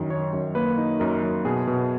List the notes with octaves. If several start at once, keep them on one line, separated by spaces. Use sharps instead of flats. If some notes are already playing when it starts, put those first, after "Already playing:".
Already playing: F#2 D#3
D#3 C#5
F#2
A#3 B4
D#4
F#2 A#4
F#2
B2 G#4
B2